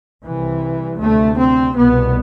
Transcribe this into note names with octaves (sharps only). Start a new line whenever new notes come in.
C2 C3 E3
D2 C3 A3
C4
C2 B2 B3